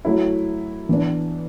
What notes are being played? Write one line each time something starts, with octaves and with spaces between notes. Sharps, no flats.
F#3 A3 E4
E3 B3 D4